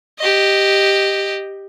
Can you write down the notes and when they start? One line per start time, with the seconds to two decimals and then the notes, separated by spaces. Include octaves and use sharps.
0.19 G4 D#5